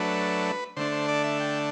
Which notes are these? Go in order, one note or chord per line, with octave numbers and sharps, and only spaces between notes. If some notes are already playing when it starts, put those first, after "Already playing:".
Already playing: F#3 A3 D4 B4
D3 A3 D4 C5
C5
D5
E5
G5